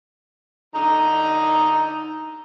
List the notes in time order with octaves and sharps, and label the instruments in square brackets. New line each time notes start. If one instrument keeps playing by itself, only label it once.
[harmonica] D3 D#4 A#5